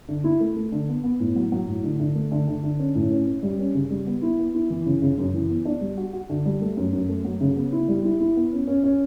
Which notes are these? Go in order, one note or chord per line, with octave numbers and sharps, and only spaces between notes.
D3
E4
A3
A3
D3
B3
B3
A2
F#3
F#3
A2
D3
D3
A3
D3
D3
D3
C#4
A2
C#4
C#4
G3
C#4
C#3
G3
B3
E4
B3
E4
E3
C#3
C#3
F#2
E3
B3
D4
G3
F#4
F#4
D3
G3
A3
F#2
F#2
A3
F#3
C#3
B3
E4
G3
E4
E4
B3
C#4
C#4
C#4